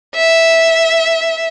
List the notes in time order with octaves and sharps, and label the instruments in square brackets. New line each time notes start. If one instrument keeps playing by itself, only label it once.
[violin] E5